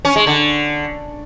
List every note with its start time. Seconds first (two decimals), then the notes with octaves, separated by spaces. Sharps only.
0.05 C#4
0.16 G#3
0.27 D3